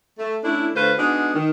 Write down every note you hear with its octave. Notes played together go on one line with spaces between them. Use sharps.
A3
A3 C#4 D4 E4
D3 A3 F4 B4 C5
G#3 B3 D4 D#4 F#4
D#3